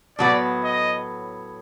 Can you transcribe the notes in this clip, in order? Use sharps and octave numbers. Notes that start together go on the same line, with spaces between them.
A2 F#3 B3 D5
D#5